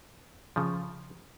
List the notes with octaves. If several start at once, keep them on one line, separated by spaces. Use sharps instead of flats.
C#3 F3